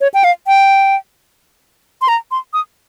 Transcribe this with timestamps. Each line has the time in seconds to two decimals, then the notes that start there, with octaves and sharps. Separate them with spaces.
0.01 C#5
0.14 G5
0.24 F5
0.47 G5
2.01 C6
2.08 A#5
2.31 C6
2.53 D#6